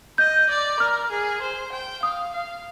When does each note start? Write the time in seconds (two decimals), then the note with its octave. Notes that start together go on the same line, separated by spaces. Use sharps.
0.18 D#5 G6
0.49 D5
0.79 A#4 F6
1.10 G#4
1.41 C5
1.72 G5
2.02 F5 D#6
2.33 F5